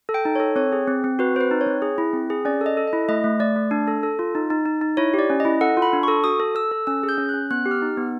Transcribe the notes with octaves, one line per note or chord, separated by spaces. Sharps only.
A4
G5
D#4
C#5
A4
C4 C#5
G#4
C4
C4
F#4 B4
C4 C5
B4
D#4
C#5
C4
G#4
E4
C4
G#4
C#4 D5
A4 D#5
A4
D#5
E4
A3 D#5
A3
A3 D5
A3
D4
A4
A4
F4
D#4
D#4
D#4
D#4
E4 C#5
G4
D5
C#4
D#5
E4
A4 F#5
F4
B5
D4
C#6
A4
F#4 D#6
A4
A4 E6
A4
C#4 E6
G#4
G6
C#4
F#6
C#4
B3 F#6
G4
F6
D#4
B3